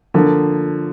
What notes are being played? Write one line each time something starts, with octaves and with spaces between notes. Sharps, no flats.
D3 F3 A#3